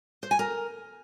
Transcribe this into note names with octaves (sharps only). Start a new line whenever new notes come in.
C5
G#5
A#4